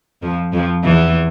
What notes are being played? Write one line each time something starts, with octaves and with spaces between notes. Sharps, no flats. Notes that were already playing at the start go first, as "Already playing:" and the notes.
F2 F3
F2 F3
E2 E3